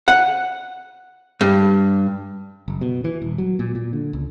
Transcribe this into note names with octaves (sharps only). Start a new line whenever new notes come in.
F#5
G2
F#1
B2
E3
D#1
F#3
A#2
A#2
D3
C#2